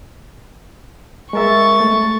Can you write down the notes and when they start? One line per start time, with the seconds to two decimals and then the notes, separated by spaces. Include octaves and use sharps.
1.33 G#3 A#4 E5 C#6 A6
1.80 A3